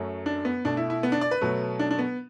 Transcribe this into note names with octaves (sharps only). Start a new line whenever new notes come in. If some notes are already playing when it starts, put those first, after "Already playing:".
Already playing: F#2 F#3 A3
D4
B3
B2 A3 D4
E4
E4
B3
D4
D5
B4
B2 F#3 A3
D4
D4
B3